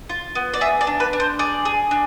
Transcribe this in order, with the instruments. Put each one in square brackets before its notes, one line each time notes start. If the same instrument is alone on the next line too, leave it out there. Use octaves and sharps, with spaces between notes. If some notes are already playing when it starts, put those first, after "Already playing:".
[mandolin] F4
B3
D5
G#4 E5
D5
D4
B4
D4
C5
G#4 D5
G#4
D4